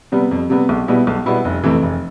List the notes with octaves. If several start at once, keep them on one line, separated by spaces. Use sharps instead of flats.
C3 G3 B3
F2
C3 G3 B3
B1
B2 G3 B3 E4
B1
B2 G3 B3 E4
F1
F2 C3 E3 A3
F1